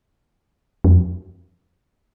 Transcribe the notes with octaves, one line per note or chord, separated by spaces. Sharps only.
F2